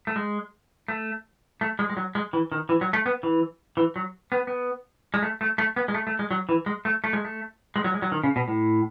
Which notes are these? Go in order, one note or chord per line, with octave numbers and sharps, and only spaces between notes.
A3
G#3
A3
A3
G#3
G#3
F#3
G#3
E3
D#3
E3
F#3
A3
B3
E3
E3
F#3
B3
B3
G#3
A3
A3
A3
B3
G#3
A3
A3
G#3
F#3
E3
G#3
A3
A3
G#3
A3
G#3
F#3
G#3
F#3
D#3
C#3
B2
A2